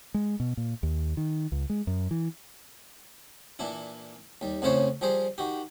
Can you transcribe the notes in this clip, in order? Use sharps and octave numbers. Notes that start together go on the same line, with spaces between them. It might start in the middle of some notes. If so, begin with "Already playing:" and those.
G#3
B2
A#2
D#2
D#3
C#2
G#3
F#2
E3
A#2 E3 D4 E4
D#2 G3
F2 A2 C#3 E4 C5 C#5
F3 G3 G#4 C5
D#3 F#4 G4